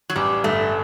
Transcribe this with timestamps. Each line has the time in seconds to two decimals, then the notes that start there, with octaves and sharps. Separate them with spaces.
0.10 F#3
0.16 A1 G3
0.44 G2 D3 A3